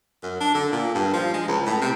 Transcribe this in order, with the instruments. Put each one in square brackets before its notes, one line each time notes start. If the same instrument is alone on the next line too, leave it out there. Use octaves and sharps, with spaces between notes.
[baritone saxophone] F#2
D4
D3
A#2
G2
F3
G#3
C#2
A2
C3